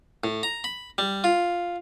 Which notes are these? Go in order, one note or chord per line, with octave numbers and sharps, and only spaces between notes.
A2
A#5
B5
G3
F4